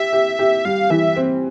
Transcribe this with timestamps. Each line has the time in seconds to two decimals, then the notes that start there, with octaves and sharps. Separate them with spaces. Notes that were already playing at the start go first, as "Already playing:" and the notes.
Already playing: G4 E5
0.13 G4
0.39 G4
0.65 G3 F5
0.90 E3 E5
1.16 C4